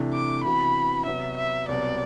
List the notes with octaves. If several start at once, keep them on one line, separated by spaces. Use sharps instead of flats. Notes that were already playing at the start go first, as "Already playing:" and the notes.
Already playing: C3 E3 A3 D4
D6
C3 E3 B3 F#4 B5
C3 F#3 B3 F#4 E5
E5
C2 B2 F#3 B3 D5